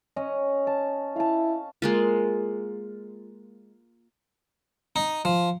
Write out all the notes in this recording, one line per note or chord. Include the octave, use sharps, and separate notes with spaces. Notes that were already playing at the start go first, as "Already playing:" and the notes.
C#4 D#5
A5
E4 F5 A5
G#3 A#3 F4
D#4
F3